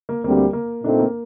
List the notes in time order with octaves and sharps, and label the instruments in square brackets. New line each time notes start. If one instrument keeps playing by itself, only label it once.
[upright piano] A#3
[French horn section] D2 D3 G3 C4 [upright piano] A#3
[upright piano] A#3
[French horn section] A#2 A3 C4 D#4 A4 [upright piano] D4
[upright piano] A#3